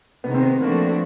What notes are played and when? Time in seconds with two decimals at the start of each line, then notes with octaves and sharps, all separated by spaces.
0.24 C3 D#3 G#3 B3
0.34 C4
0.43 B3
0.60 D3 F3 A3 A#3 D4 F#4